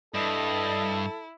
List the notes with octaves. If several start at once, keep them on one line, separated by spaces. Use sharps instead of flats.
G2 E4 A4 D#5